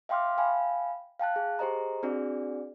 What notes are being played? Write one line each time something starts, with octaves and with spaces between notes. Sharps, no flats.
E5 F5 G5 C6 D6 F6
E5 F5 G5 G#5 B5
F5 G5 A5 F#6
G#4
G4 G#4 C5 D#5 A#5
C4 D4 F#4 G#4 D5